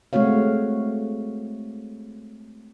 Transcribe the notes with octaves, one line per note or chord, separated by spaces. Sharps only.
G#3 A3 C4 F#4 C#5 F5